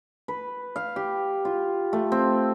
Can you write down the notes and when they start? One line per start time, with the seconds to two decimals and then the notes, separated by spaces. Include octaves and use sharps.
0.28 B4
0.76 F5
0.96 G4
1.45 F4
1.93 A3
2.12 C4